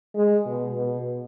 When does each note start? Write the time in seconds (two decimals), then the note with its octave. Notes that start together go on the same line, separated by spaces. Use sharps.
0.15 G#3
0.46 B2
0.76 B2